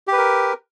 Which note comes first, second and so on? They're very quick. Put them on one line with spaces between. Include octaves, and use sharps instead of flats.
G4 B4 A#4